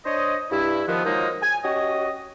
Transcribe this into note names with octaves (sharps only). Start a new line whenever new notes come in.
D4 C5 C#5 D#5
G2 E4
D#3 F3 B3
D#3 F3 F#3 G#3 A#3 D#4
G#5
C#4 F#4 G4 D#5